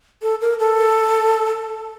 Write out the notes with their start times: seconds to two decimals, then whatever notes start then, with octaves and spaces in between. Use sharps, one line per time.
0.22 A4
0.41 A#4
0.59 A4